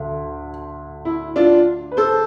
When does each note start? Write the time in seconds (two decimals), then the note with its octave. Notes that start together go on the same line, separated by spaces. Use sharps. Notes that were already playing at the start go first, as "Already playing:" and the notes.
Already playing: D2 D3
1.05 E4
1.36 D4 F4
1.92 B4
1.97 A4 C5